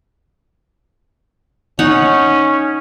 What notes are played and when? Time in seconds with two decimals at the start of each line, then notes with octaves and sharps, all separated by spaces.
1.79 C#4 D#4 C#5 F#5